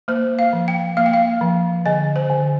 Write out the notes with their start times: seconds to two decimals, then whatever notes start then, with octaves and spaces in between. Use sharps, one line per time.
0.08 A#3 C5
0.39 F5
0.53 F3
0.68 G5
0.97 A#3 F5
1.06 G5
1.13 F5
1.41 F3
1.86 D3 D#5
2.16 C5
2.30 D3